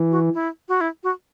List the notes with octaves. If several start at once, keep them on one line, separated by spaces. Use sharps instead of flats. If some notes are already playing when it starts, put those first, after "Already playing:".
Already playing: E3
F#4
E4
F#4
E4
F#4